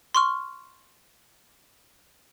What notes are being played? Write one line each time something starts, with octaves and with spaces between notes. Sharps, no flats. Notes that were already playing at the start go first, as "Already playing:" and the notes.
C6 C#6 F6